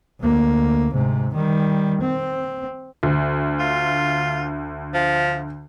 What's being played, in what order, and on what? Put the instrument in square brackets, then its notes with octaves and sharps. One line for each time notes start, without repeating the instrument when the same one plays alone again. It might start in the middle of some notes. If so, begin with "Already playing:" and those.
[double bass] D2 A#3
G#2 C3
D#3 G3
C4
[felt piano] D2
[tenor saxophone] F4
F3